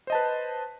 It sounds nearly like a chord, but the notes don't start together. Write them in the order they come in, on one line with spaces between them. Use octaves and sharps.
C5 D#5 A5 B4